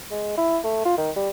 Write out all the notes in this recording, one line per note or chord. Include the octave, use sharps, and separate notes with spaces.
G#3
E4
A3
F4
D#3
G3